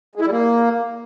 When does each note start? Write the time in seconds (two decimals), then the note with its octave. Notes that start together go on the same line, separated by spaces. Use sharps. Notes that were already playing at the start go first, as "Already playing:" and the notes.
0.15 G#3
0.21 E4
0.26 G3
0.31 A#3